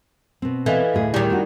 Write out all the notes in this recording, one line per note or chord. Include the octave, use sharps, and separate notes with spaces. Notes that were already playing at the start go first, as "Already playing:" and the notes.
B2 C4
E3 A4 D#5 F5
D2 A2 G#4
D#3 G3 E4 G4 D5
C4 D4 F#4